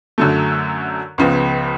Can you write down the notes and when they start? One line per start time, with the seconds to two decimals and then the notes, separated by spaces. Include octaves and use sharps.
0.18 F#2 D3 F#3 A3
1.18 C#2 C#3 F3 B3